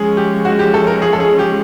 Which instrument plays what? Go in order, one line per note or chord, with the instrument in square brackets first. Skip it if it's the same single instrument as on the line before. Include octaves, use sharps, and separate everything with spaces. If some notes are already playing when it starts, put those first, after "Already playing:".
Already playing: [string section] F3 G#3 C#4 [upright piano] G#4
[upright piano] G4
F#4
G4
A4
A#4
G#4
A4
G#4
G4